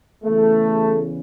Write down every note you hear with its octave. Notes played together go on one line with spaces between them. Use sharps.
E2 C#3 E3 A3